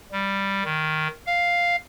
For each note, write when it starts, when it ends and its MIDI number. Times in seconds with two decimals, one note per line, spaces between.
0.12 0.63 55
0.65 1.08 51
1.26 1.76 77